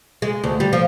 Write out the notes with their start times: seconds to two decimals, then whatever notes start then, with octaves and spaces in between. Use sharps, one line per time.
0.22 G#3
0.44 D2
0.60 G3
0.73 F3